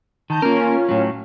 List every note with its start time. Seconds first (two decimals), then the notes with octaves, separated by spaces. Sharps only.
0.30 D#3 A5 A#5 G6
0.42 A#3 C#4 F4 A#4
0.89 A2 F#3